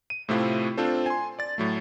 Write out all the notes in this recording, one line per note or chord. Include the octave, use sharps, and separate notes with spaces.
D#7
A2 C3 A3 C4 E4 F4
C4 D4 F4 A4 C5
G#5 C6
D5 A6
A2 F#3 A3